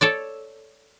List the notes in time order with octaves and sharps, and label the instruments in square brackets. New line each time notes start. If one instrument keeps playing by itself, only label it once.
[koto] A4 C#5 D5